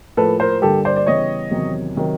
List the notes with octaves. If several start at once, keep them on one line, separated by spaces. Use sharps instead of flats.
A2 F3 A#3 A4 B4
A#4 C5
G2 D3 G3 A#3 D4 G4 A4
C5 D5
D5
C#3 E3 G3 B3 C#5 D#5
E2 C3 D#3 F#3
C3 D#3 F#3